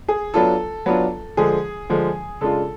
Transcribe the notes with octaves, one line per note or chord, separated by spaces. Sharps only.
G#4
F#3 B3 D4 F4 A4
F#3 B3 D4 F4
D3 F3 G#3 G#4
D3 F3 G#3
C#3 G#3 D4 F4 A4